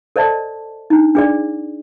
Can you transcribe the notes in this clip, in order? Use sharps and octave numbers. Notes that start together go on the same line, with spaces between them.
A4 C5 D5 D#5 A5
D4 D#4
D4 G#4 D5